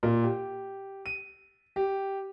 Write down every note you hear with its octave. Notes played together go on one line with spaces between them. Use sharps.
A#2
G4
D#7
G4